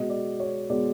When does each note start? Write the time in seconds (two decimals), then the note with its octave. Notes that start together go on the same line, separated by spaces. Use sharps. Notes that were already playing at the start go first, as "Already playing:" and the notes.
Already playing: B2 G#3 B3 D#5
0.10 D5
0.40 C#5
0.69 B2 G#3 B3 D5